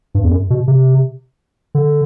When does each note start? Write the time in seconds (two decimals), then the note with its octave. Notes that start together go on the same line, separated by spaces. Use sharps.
0.15 G2
0.23 E2
0.31 F#2
0.50 B2
0.68 C3
1.75 D3